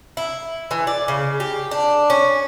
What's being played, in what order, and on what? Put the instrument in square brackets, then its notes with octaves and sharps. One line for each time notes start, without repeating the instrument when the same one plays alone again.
[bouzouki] E4
E3
D5
C#3
G4
D4
C#4